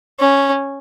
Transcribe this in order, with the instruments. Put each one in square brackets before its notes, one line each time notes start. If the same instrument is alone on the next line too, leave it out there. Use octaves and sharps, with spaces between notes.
[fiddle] C#4